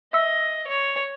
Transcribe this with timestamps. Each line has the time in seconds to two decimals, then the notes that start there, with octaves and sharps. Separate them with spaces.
0.13 D#5 E5 E6
0.67 C#5